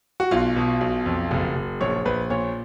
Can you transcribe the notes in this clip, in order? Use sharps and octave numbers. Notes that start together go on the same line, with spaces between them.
F#4
B1 F4
B2
B1
F2
F#1
F#1
A#1 C#5
A#1 B4
A#2 C#5